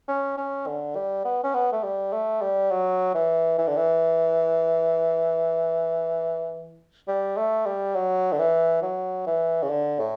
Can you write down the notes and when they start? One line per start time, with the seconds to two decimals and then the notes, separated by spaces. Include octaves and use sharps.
0.08 C#4
0.37 C#4
0.67 D3
0.96 G3
1.25 B3
1.44 C#4
1.54 B3
1.72 A3
1.83 G3
2.13 A3
2.41 G3
2.71 F#3
3.14 E3
3.58 E3
3.67 D3
3.76 E3
7.08 G3
7.37 A3
7.66 G3
7.95 F#3
8.32 D3
8.39 E3
8.82 F#3
9.26 E3
9.62 C#3
9.70 D3
9.99 A2